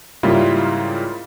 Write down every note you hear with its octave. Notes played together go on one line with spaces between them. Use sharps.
G#2 C#3 G3 A#3 E4 F4